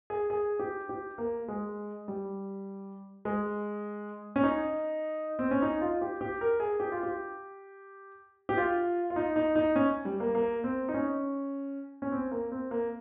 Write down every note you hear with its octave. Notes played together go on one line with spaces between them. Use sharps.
G#4
G#4
G4
G4
A#3
G#3
G3
G#3
C#4
D#4
C4
C#4
D#4
F4
G4
G4
A#4
G#4
G4
F4
G4
G4
F4
F4
D#4
D#4
D#4
C#4
G3
A#3
A#3
C4
D#4
C#4
C#4
C4
A#3
C4
A#3